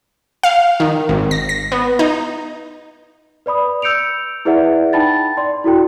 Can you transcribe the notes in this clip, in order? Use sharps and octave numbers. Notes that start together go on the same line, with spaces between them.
F5
D#3
G#1
A#6
A#6
B3
D#4
B4 D5 B5 D#6
E6 G6 C#7 D7 F7
E4 G#4 B4 D5 E5 F#5
D#4 G5 A5 B5 A6
D5 C6
E4 F#4 A4 G5